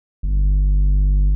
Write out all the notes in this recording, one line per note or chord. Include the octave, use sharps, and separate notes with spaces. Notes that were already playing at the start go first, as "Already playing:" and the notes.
G1